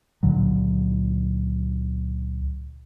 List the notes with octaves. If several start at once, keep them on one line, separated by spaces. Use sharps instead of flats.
C#2 A#2 D3 F#3